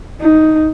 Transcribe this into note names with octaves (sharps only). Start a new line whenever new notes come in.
D#4